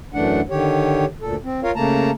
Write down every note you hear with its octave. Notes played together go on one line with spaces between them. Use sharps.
F#2 E3 A3 D4 F#5
D3 D#3 G4 C#5
D2 A#2 A4
C4
F4 A#4 C#5 F5
C#3 A3 A#3 A5 A#5